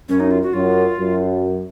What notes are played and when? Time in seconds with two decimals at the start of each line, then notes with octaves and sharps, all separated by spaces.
0.09 F#2 C#4
0.20 D#4
0.31 F4
0.43 F#4
0.53 F#2 F4
0.98 F#2